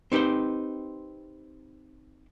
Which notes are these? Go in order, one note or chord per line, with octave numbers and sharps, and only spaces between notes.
C4 D#4 G4 B4 C5